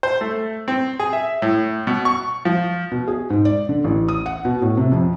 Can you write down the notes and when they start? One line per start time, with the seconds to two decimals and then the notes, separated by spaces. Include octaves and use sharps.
0.03 C5
0.21 A3
0.68 C4
0.99 G#4
1.13 E5
1.42 A2
1.87 B2
2.05 C#6
2.45 F3
2.91 B2
3.08 G#4
3.30 G#2
3.45 D5
3.69 D3
3.84 A1
4.08 D#6
4.26 F#5
4.45 B2
4.62 A2
4.77 C3
4.92 F2